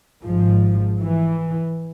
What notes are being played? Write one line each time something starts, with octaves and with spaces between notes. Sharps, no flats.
G#1 G#2 F3
E3